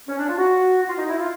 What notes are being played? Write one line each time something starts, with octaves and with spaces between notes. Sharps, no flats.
C#4
D4
F4
F#4
F#4
F4
D#4
E4
F4